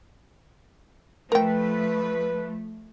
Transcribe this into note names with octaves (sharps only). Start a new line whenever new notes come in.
F3 A3 A#4 B4 G5